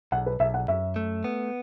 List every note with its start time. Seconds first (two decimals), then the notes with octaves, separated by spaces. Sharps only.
0.12 B1 F#5
0.26 B4
0.40 B1 E5
0.54 F#5
0.68 F#2 E5
0.96 A3
1.24 B3